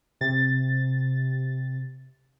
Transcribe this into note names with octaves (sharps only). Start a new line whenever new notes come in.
C3 A6